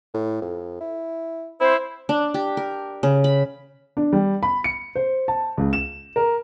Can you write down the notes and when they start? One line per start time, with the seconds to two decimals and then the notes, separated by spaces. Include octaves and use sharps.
0.14 A2
0.42 F2
0.81 E4
1.61 C4 E4 C5
2.09 D4
2.34 G4
2.57 A#4
3.03 C#3
3.24 B5
3.97 D4
4.13 G3
4.43 B5
4.64 C#7
4.95 C5
5.28 A5
5.58 C#2
5.73 E7
6.16 A#4